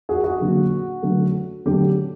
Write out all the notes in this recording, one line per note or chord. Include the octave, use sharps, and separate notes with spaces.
F#4 G#4
F#4
D3 F#3 A#3
D3 F#3 A3
D3 F#3 A3 G4